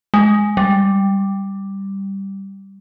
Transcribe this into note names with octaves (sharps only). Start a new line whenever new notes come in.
G#3
G3